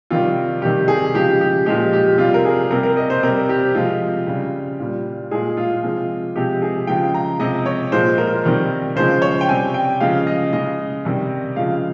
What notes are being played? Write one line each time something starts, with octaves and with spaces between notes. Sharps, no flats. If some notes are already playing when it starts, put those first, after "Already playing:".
C3 D#3 G3 F4
C3 D#3 G3 G4
G#4
C#3 F3 G#3 G4
G4
A#2 F3 G#3 G4
G4
C3 G3 F4
A#4
G#4
C3 G3 A#4
A#4
D#5
C5
C3 G3 A#4
G4
C3 F3 G#3 F4
C#3 G3
A#2 G3
A#2 G#3 G#4
F4
C3 F3 G#3
C3 F3 G#3 G4
G#4
C#3 F3 G#3 G5
A#5
C3 F3 G#3 D#5
C#5
A#2 F3 G#3 C5
A#4
C3 D#3 G3
C#3 F3 G#3 C5
C#5
G5
C3 G3 G#5
G5
C#3 F3 G#3 F5
D#5
C#3 G#3 D#5
C3 D#3 G3
C#3 F3 G#3 F5